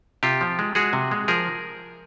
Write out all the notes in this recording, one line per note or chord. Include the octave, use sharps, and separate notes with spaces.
C3 F4 G4
F3
G#3
G#3 F#4 G#4
C3
G#3
F3 G#4 A#4